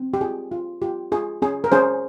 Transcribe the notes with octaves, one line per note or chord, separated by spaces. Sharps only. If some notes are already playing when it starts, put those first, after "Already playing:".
Already playing: C4
G4
F4 G#4
F4
F4 G4
F4 G#4
C#4 G#4
A#4
C#4 G#4 C5